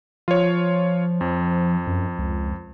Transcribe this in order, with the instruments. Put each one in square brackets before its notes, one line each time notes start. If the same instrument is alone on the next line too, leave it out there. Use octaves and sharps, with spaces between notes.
[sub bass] F3 [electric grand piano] F4 C#5
[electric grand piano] F2
[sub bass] F#2
C#2